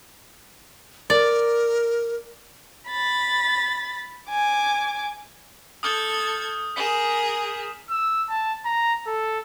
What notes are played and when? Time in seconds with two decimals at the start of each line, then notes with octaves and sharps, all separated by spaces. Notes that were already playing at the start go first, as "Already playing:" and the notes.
1.10 A#4 D5
2.89 B5 A6
4.30 G#5 D6
5.83 A4 D#6 F6 G6 G#6
6.76 G#4 A#4 B6 E7
7.90 E6
8.29 A5
8.65 A#5
9.07 A4